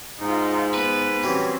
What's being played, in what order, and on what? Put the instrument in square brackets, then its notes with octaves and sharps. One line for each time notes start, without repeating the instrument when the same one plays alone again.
[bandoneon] G#2 [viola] D#4 F4
[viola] B3 [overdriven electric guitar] B4
[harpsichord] E3 F#3 G3 [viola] C4 C#4